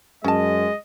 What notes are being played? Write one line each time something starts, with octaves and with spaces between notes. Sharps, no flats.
F#2 G#3 C#4 D#5 A5